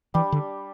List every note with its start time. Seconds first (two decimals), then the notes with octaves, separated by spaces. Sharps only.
0.14 E3 G3 D4 G4
0.32 D3